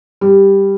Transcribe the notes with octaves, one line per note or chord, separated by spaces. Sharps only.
G3